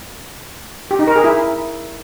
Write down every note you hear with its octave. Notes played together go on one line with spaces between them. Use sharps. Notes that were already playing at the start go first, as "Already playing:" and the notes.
G4
D#4
A#4
G#4
E4